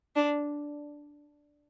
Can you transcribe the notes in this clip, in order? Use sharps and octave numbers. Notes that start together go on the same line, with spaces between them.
D4